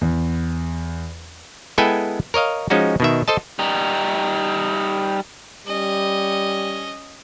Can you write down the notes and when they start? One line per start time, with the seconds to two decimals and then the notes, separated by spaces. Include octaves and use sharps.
0.01 E2
1.78 G#3 B3 E4 A4 G5 G#5
2.34 A#4 C#5 D#5 F5
2.70 F3 G#3 C#4 D#4 F#4
3.00 B2 D#3 E5
3.28 A4 C5 D#5 A5
3.59 G3 D#4
5.67 G3 C#4 D#5